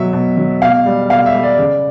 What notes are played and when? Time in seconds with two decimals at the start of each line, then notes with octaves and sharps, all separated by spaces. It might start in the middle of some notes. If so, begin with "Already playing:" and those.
Already playing: B2 F#3 E5
0.13 B2
0.37 F#3
0.62 B2 F5
0.86 G3
1.10 B2 F5
1.26 E5
1.34 G3
1.43 D5
1.58 C#3